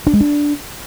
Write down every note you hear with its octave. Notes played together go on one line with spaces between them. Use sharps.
D4
G#3
D4